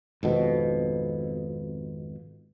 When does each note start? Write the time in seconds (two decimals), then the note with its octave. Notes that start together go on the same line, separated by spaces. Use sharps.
0.23 G#1 F2 B2